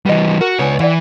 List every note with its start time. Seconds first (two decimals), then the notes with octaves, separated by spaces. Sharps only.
0.06 E3 G3 B3 D#5
0.41 F#4 A#4
0.59 C#2 B3 C#4 D4 C#5
0.80 E3 D5 F#5 G5